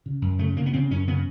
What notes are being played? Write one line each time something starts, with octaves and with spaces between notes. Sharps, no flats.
C#3
F#2
C#3 A3
C#3 A#3
B3
C#3 C4
F#2 C#4
C#3 B3